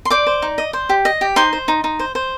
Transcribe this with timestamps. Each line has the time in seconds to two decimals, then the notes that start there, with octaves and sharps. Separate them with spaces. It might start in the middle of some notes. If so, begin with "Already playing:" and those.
0.05 C6
0.10 C5 D5 D6
0.27 C5
0.42 D#4
0.58 D#5
0.73 C5
0.89 G4
1.05 D#5
1.21 G4
1.36 D#4 C5 C6
1.53 C5
1.68 D#4
1.84 D#4
1.99 C5
2.15 C5